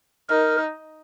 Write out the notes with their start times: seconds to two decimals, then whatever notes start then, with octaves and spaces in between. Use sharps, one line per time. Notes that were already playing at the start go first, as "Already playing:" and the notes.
0.29 D#4 A#4